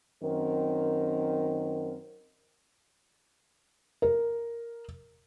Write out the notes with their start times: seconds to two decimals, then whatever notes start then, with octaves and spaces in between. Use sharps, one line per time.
0.23 F#2 D#3 C4 A#4
4.02 A#4